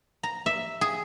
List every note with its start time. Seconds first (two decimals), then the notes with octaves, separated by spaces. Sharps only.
0.23 A#5
0.46 E5
0.81 G#4